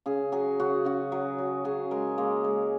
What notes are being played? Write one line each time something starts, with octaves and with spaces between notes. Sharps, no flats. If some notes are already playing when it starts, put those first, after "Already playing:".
C#3 G#4
F#3 G#4
C#3 F#4
C#3 F#4
F#3
F#3
C#3 G#4
G#3 A#4
G#3 A#3
G#3